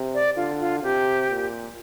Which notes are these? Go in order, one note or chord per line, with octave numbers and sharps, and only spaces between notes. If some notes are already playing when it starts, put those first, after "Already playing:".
Already playing: C3
D5
D3 F4
F4
C3 G4
A#2